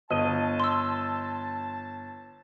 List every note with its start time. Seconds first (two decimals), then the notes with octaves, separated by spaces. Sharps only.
0.10 G1 D#5 A5
0.60 C6 E6